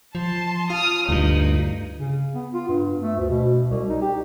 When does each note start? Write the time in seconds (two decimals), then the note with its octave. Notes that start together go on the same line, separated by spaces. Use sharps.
0.15 F3 A5 C6
0.70 F4 D#6 F6
1.09 D2 G2 D#4
1.97 C#3
2.34 B3
2.54 F4
2.69 G2
3.02 A3
3.17 D2
3.29 B2
3.71 C2
3.88 D#4
4.02 G4